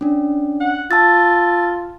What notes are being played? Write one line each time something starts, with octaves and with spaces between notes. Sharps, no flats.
C#4 D4
F#5
F4 A5 E6 A6